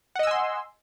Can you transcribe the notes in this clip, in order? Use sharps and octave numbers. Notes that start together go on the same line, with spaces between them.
D#5 F#5 G#5 C6 E6